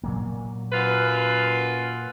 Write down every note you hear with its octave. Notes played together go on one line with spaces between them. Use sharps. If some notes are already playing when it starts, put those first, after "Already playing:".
A#2 F#3 A#3
F#2 F4 B4